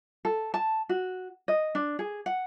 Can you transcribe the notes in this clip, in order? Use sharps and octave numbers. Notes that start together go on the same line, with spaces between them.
A4
A5
F#4
D#5
D4
G#4
F#5